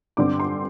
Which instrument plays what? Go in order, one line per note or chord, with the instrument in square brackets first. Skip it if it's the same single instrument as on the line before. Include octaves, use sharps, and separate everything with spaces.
[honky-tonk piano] G2 D3 C4 D6
C6